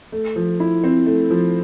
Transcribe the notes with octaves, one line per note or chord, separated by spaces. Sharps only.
A3
F3
E4
C4
A3
F3